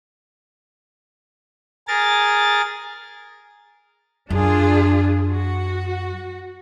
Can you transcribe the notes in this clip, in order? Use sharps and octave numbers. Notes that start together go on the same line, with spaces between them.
G#4 A#4 A6
F#2 D4 F4 G#4
F#4